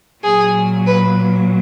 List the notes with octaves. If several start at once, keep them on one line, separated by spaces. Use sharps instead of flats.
A#2 F#3 G#4
B4